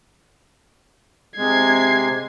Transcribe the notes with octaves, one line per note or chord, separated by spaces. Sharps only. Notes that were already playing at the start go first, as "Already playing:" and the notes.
C3 G#3 G#6 C7